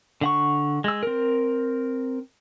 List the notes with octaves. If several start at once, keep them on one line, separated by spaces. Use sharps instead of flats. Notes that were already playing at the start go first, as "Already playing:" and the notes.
D3 F#5 C#6
G#3 E6
C4 A#4